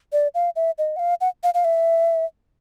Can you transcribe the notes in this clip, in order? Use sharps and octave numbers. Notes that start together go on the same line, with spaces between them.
D5
F5
E5
D#5
F#5
F5
F#5
F5
F5
E5